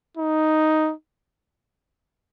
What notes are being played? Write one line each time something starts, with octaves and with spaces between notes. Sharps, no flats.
D#4